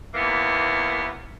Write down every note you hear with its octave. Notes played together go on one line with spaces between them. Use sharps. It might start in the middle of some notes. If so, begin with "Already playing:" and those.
D#2 E3 A#3 B3